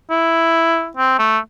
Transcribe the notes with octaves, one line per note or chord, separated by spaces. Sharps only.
E4
C4
A3